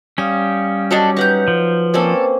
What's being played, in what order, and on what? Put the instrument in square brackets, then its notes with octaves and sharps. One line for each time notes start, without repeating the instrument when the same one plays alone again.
[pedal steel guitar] G3 C#4 [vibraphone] F5 D#6
[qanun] F#3 G4 [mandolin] D4 D#4 A4
[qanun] D#4 F#5 [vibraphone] B4 [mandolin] A#5 G6
[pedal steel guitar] F3
[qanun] A#3 C4 C#4 [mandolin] A4 D5